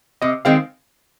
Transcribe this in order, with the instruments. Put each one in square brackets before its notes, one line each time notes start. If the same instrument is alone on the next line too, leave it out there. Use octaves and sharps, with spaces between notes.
[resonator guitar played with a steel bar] C3 [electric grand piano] D#5
[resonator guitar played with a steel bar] D#3 G#3 C4 [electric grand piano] F5